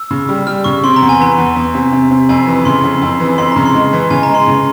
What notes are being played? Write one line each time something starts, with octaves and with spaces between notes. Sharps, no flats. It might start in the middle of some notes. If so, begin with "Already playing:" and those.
Already playing: E6
C#3
G3
G3 F6
C#3 C#6
C3 C6
A#5
E2
G#5
E3 A#5
E2
E2
C3
C3
C3
F2 G#5
E3
C#3 C6
F2
F2
E3
F2 C6
C#3 A#5
C6
G#3
E3
C#3 G#5
A#5
G#3
C6
C#3